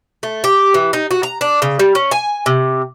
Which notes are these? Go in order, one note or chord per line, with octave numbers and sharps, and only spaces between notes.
A3
G4
E3
D#4
F#4
A#5
D4
C#3
G3
C#4
G#5
C3